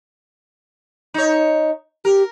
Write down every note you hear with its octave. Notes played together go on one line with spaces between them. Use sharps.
D#4 C#5
G4 A#4